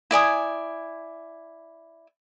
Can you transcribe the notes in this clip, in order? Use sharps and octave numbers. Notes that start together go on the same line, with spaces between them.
E4 D5 G#5 D#6